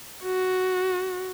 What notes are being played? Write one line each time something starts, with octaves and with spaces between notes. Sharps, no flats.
F#4